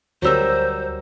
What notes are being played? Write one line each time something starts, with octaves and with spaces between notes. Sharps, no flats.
D2 F#3 G3 A#4 C5 E6